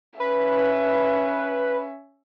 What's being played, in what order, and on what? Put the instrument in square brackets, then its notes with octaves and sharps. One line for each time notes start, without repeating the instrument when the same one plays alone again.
[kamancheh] C#4 E5 [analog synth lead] B4